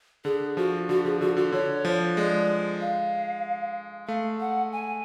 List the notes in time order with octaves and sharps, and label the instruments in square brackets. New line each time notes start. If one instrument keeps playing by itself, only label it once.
[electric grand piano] D3 [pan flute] G#4
[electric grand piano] F3 [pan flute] F#4
[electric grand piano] D3 [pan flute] F#4
[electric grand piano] F3 [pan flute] G#4
[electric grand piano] D3 [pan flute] F#4
[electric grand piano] D3 [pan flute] F#4
[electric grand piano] D3 [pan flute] C#5
[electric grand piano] F3
[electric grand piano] G#3 [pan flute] D5
[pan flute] F5
[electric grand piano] A3 [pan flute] F5
[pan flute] F#5
G#5